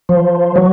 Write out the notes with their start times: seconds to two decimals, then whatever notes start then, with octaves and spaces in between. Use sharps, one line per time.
0.09 F3
0.56 F#3